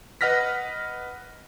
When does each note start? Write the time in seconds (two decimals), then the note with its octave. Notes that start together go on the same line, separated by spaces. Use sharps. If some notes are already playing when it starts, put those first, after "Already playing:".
0.21 B4 D#5 F#5 F6 A#6 B6